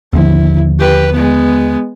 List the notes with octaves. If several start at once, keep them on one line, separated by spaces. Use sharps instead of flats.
D#2 D3 F3 E4
G4 B4
G#3 B3